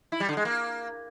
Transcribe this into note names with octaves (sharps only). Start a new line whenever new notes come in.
E4
G3
D3
G#3
A#3